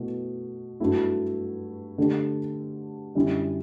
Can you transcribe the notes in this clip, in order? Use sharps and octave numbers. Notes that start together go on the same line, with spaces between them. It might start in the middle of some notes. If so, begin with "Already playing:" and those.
Already playing: B2 A3 E4
G2 F#3 A3 E4
D3 A3 D4 G4
F#2 D3 G3 C#4 E4